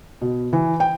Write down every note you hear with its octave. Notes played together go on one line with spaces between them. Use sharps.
B2
E3
G5